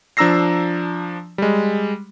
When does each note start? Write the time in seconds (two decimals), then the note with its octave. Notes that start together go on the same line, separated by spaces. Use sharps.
0.17 F3 D4 A#5 E6 A#6 C7
1.38 G3 G#3